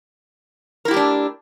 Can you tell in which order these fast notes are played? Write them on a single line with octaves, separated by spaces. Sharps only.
A#4 E4 G4 A3 D4